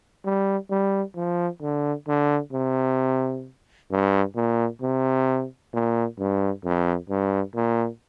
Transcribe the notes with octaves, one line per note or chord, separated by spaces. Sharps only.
G3
G3
F3
D3
D3
C3
G2
A#2
C3
A#2
G2
F2
G2
A#2